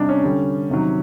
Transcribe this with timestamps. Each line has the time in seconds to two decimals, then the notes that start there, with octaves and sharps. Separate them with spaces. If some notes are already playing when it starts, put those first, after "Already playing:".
Already playing: C3 G3 D4 D#4
0.09 C#4
0.24 D3 G3
0.70 C3 D#3 F#3